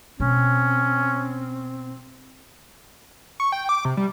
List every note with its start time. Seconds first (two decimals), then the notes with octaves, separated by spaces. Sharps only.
0.20 B2 C4 C#4
3.40 C#6
3.52 G5
3.69 D6
3.85 C3
3.97 G3